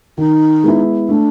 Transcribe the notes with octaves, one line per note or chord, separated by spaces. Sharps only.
D#3 D#4
G#3 B3 E4
A3 D4